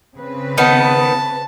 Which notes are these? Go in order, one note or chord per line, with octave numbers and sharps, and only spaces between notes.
C#3 C4 B4
D#3 B3 A5